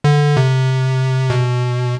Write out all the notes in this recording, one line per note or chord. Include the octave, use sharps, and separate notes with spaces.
D3
C3
B2